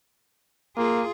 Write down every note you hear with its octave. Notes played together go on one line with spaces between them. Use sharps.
A#3 F4 G#4